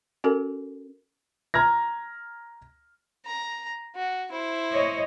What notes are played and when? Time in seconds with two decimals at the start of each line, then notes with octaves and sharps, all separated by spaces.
0.24 C#4 F#4 A4 A#4
1.54 A#5 F6 G#6 A#6
3.26 A#5
3.95 F#4
4.31 E4 C5
4.71 C#5 D#5